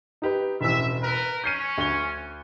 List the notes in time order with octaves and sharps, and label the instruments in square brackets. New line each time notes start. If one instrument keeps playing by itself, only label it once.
[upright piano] D#4 G4 B4
[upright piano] E1 A1 [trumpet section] E5
[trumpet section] A#4 B4
[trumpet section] C#4 [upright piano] G6 C7 D#7
[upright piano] D2 G7